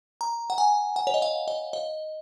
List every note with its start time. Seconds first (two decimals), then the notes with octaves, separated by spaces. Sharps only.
0.21 A#5
0.50 F#5
0.58 G#5
0.96 F#5
1.07 C#5
1.14 D#5
1.22 F5
1.48 D#5
1.73 D#5